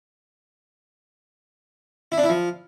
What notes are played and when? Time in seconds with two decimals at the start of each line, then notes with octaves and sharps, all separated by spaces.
2.12 E4
2.18 D4
2.23 E4
2.29 F3